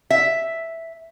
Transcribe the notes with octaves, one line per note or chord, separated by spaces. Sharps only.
E5